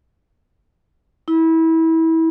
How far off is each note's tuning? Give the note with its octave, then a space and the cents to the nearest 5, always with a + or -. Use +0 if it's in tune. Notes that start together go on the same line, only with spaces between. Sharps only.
E4 -25